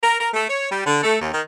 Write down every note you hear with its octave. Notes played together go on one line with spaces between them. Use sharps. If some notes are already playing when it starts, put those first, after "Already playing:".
A#4
A#4
A3
C#5
G3
D3
A3
D#2
D#3